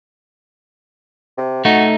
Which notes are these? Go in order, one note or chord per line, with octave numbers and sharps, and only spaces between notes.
C3
A3 D#4 F#4